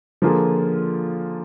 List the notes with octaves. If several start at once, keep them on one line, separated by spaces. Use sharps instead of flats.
D3 F3 A#3 F4 G#4